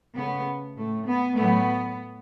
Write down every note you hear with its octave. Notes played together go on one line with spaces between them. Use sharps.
C#3 A3 B3
A2 A3
B3
A2 F#3 A3 B3